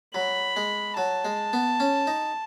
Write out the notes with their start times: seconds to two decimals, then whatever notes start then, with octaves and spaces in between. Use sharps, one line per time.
0.14 F#3 B5
0.56 G#3
0.97 F#3 A5
1.25 G#3
1.53 B3
1.80 C#4
2.07 D#4